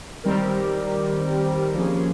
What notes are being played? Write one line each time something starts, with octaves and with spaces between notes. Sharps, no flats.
D#3 G3 C4 G4 A#4
F3 A#3 C#4 G#4